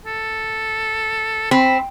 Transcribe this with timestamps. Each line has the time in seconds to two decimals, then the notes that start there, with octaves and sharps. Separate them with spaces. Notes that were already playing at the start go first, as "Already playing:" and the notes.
0.06 A4
1.51 C4 B5